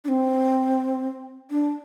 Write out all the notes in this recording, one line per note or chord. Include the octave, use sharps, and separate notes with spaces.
D4
C4
D4